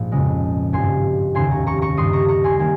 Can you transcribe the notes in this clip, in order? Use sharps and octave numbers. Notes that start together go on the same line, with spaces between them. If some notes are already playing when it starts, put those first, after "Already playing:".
Already playing: A#1 G#2 F3 A#3
F2 C#3 G#3
G#1 G2 F3 G#5 C6
F1 D#2 C#3 G#5 C6
A#5 C#6
A#5 C#6
A#5 C#6
G2 D#3 G3 C6 D#6
A#5 C#6
A#5 C#6
G#5 C6
D#3 G3 A#3 G#5